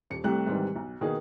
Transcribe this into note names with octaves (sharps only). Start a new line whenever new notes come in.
D#1 C#7
C2 G3 A3 G4 F#6
G#2 C3 D#3 E3 G3
B1
B2 D#3 A#3 D#4 G#4 B4